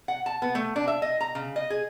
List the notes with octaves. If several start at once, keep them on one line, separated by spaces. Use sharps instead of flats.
F#5
A5
B3
A3
D4
E5
D#5
A#5
C#3
D#5
G#4